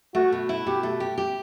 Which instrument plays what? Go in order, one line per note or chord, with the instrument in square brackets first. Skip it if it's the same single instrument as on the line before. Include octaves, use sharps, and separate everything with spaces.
[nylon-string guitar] A3 [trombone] F#4
[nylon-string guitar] B2
E4
[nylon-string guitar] B2 [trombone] G4
[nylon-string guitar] A3
G4
G4